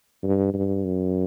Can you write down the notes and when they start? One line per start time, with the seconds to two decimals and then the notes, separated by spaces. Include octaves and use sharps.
0.23 G2
0.54 G2
0.84 F#2